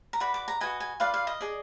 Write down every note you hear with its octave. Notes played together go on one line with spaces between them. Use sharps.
A#5
F#4 B4 D5 B5
D6
A#5
F#4 B4 D#5 G#5
G#5
F4 B4 D5 F5
F5
D#5
G#4 D5